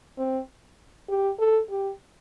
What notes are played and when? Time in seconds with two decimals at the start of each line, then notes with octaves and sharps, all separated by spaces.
0.18 C4
1.09 G4
1.39 A4
1.70 G4